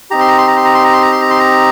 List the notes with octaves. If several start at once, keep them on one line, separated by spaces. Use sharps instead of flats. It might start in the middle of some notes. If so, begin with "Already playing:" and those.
C4 D#4 G4 A#5
C6
A#5
C6
A#5
C6
A#5
C6
A#5
C6
A#5
C6
A#5
C6
A#5